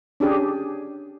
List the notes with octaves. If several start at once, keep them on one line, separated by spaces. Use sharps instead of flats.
C#4 D4 G4 G#4